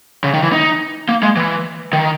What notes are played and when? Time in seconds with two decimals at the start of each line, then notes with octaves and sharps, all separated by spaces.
0.24 C#3
0.34 D#3
0.43 E3
0.53 D#4
1.09 A#3
1.23 G#3
1.37 E3
1.93 D#3